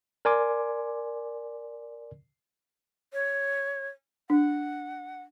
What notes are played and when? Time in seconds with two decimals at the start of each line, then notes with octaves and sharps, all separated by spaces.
0.25 A#4 D5 G#5 C6 D6
3.13 C#5
4.30 D4 F#5